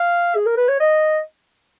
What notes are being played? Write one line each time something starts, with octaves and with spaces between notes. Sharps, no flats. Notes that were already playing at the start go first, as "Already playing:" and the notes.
Already playing: F5
G#4
A#4
B4
C#5
D#5